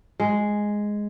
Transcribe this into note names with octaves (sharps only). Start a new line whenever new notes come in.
G#3